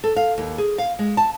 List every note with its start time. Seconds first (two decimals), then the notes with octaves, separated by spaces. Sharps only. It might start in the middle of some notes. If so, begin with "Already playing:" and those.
0.04 A4
0.16 F5
0.38 D#2
0.58 G#4
0.78 F5
0.99 G#3
1.17 A5